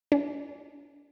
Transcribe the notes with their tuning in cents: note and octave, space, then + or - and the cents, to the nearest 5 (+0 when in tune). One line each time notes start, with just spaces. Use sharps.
D4 -30